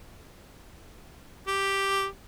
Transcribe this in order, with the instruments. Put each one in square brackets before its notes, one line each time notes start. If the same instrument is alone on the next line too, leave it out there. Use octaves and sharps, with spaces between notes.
[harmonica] G4